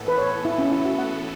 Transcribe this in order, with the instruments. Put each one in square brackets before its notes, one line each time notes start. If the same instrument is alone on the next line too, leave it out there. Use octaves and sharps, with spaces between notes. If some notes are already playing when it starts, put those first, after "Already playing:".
Already playing: [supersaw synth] A2 E3 B3 A4
[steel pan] B4
C#5
E4
C#4
E4
F#4
F#5